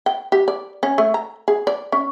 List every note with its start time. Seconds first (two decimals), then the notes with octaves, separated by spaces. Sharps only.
0.06 G5
0.32 G4
0.48 D5
0.83 C#4
0.98 A3
1.14 A#5
1.48 G#4
1.67 D5
1.92 C#4